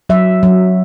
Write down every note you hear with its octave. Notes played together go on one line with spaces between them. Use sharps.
F#3 E5
F#3